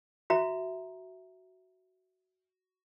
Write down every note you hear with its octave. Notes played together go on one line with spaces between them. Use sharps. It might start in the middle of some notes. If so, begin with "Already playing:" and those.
F#4 E5 A#5